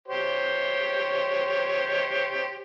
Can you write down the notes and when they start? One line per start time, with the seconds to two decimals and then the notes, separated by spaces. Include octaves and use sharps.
0.08 G4 C5 C#5